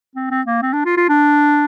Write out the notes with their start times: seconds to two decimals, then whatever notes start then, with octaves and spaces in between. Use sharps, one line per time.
0.16 C4
0.31 C4
0.47 A#3
0.62 C4
0.74 D4
0.86 F4
0.97 F4
1.09 D4